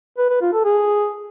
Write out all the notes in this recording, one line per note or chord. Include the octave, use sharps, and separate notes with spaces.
B4
B4
F4
A4
G#4